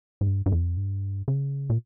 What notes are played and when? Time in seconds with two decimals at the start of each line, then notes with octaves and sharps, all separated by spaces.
0.21 G#2
0.27 G2
0.46 G2
0.52 F2
0.77 G2
1.28 C#3
1.70 A#2